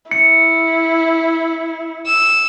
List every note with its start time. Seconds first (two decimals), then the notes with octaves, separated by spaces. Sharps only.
0.11 E4 C#7
2.06 E6